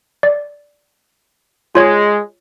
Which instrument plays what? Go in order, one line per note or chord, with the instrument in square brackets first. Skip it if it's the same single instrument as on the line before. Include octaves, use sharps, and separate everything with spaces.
[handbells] D5
[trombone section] G#3 [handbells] F4 C#5 G#6